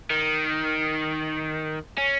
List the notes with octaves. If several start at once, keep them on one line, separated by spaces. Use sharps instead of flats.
D#3
C#4